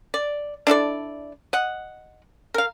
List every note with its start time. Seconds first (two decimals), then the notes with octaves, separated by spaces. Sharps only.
0.14 D5
0.67 D4 E4 A4 D5
1.53 D#5 F#5
2.54 A#4 F5